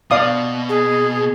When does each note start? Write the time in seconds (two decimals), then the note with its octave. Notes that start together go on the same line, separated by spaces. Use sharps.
0.11 B2 D5 F5 D#6
0.69 G#4